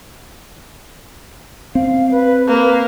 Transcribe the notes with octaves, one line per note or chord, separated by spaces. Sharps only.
C4 F5
B4
A#3 B4